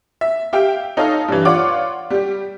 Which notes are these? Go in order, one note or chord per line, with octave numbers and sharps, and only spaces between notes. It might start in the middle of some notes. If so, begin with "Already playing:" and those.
E5
G4 E5 F5 G5
D#4 A4 C#5 D#5 F5
G2 E3
F4 C#5 D5 F#5 C#6 D6
G3 G4